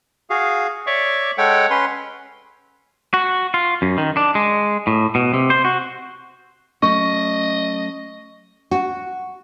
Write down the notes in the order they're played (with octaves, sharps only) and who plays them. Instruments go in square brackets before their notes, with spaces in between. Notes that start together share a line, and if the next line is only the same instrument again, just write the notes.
[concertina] F#4 G#4 F5
C#5 D5 E5 C#6 D6
G#3 A4 C#5 F#5 G5
C#4 B4 C6
[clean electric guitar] F#4
F4
F#2
D#3
D4
G#3
A2
B2
C3
C5
F#4
[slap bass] F#3 A3 C#4 [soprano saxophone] D#5 [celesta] C#6
[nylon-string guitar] F#4